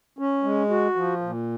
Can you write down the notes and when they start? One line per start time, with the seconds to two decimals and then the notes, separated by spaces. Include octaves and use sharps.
0.19 C#4
0.43 G#3
0.70 F#4
0.96 F3
1.21 A#2